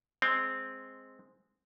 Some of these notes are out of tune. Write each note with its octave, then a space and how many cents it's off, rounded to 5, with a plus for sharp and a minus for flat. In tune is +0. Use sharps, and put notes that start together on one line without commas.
G#3 +0 C4 +0